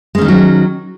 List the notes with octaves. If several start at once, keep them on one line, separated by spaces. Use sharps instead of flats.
D#3 F#3 G#3 C#4 D#4